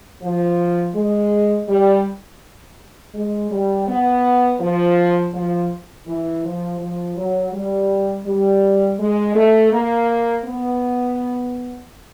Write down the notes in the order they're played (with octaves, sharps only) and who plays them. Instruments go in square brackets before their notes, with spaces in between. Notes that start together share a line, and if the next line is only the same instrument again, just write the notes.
[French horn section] F3
G#3
G3
G#3
G3
B3
F3
F3
E3
F3
F3
F#3
G3
G3
G#3
A3
A#3
B3